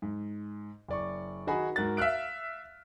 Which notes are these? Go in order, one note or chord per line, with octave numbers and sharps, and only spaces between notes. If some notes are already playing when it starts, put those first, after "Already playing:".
G#2
F#1 D5 C#6
D#3 D#4 F#4 G#4 G#5 B5
G#2 F#4 A#4 F#6 A6
E5 F5 F6 F#6 D7